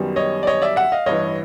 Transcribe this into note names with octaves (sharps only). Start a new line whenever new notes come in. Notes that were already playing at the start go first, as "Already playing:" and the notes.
Already playing: F#2 D#3 G3 B3
C#5 D#5
D5
C#5 D#5
D5 E5
E5 F#5
D#5 F5
A1 G2 E3 C#5 D#5